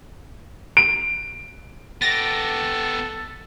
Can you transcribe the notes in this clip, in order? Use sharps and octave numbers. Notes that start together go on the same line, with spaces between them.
D7
B3 G4 A4 A6 A#6